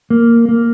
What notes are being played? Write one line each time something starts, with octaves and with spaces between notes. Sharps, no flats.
A#3
A#3